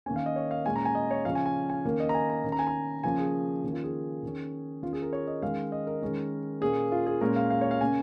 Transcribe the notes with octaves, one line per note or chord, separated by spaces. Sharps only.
D#3 A#3 C#4 G#5
F5
D#5
C#5
F5
A#2 G#3 C#4 G#5
A#5
G#5
D#5
C#5
C#3 F3 C#4 F5
G#5
G#5
G#5
D#3 A#3 C#4
D#5
A#5
G#5
A#5
D#3 C#4
A#5
G#5
A#5
C#3 F3 A#3 C#4 G#5
G#4
D#3 A#3 C#4
F4
G#4
D#3 C#4
D#3 C#4 F4
G#4
A#4
C#5
D#5
D#3 G#3 C#4 F5
D#5
A#4
D#3 G#3 C#4
A#2 A#3 C#4 G#4
F4
G#4
A#2 G#3 C#4 A#4
F5
F5
C#5
F5
C#3 A#3 C#4 G#5